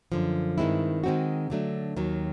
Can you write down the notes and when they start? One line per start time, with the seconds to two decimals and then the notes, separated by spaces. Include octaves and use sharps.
0.12 F#2 D3 F3
0.58 G2 D#3 G#3 C4 E4
1.04 D#3 G#3 C4 D#4 F#4
1.50 D3 F#3 A3 D4
1.96 D#2 D#3 F#3